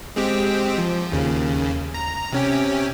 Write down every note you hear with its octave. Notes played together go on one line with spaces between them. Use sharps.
G#3 C4 G4
F3
D#2 C#3
A#5
C3 C#4 G4